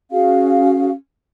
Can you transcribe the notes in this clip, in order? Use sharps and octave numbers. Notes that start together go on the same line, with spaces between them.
C#4 F#4 G#4 F5